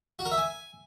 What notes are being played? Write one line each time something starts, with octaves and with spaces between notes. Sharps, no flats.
F#4
A#4
E5
G#5